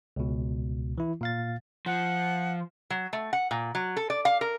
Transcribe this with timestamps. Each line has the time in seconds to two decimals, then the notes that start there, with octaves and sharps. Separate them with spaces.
0.16 C#2 B2
0.98 E3 E4
1.21 A#2 F5 A6
1.86 F3 F#5
2.90 F#3
3.13 A3
3.33 F#5
3.51 A#2
3.75 F#3
3.97 A4
4.10 D5
4.25 F5
4.41 A#4